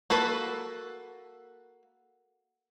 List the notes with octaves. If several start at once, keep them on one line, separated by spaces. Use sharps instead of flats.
A#3 F#4 A4 B4